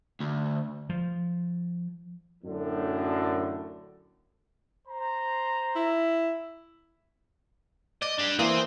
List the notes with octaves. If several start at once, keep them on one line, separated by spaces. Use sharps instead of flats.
D2
F3
F#2 A2 D3
C5 A#5
E4
D5 D#5
D4 G4
E3 A#3 C4 D#6